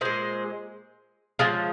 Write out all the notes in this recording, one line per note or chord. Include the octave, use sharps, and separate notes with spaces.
A#2 G#3 G#4 C5
C#3 F3 G#3 F4 G#4